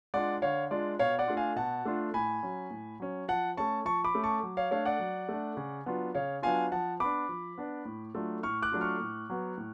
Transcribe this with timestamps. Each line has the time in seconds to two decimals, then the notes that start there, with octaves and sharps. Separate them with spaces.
0.14 G#3 D4 F4 D5 F#5
0.42 D3 C#5 F5
0.71 G#3 D4 F4 D5
0.99 B2 C#5 F5
1.19 D5 F#5
1.28 A3 D4 F4
1.37 F5 G#5
1.56 B2 F#5 A5
1.85 A3 D4 F4
2.14 A2 G#5 B5
2.43 F#3 C#4
2.71 A2
3.00 F#3 C#4
3.28 F3 F#5 A5
3.57 A3 C#4 A5 C#6
3.85 F3 A5 C#6
4.04 B5 D6
4.14 A3 C#4
4.24 A5 C#6
4.43 F#3
4.57 C#5 F5
4.71 A3 D4 C#5 F5
4.85 D5 F#5
5.00 F#3
5.29 A3 D4
5.57 C#3
5.86 F#3 B3 D4 F4
6.15 C#3 C#5 F5
6.42 F#3 B3 D4 F4 F5 G#5
6.72 F3 F#5 A5
7.00 B3 D4 B5 D6
7.29 F3
7.58 B3 D4
7.85 A2
8.15 F#3 A3 D4 F4
8.43 A2 C#6 F6
8.62 D6 F#6
8.72 F#3 A3 D4 F4
8.81 C#6 F6
9.00 A2
9.30 F#3 B3
9.58 A2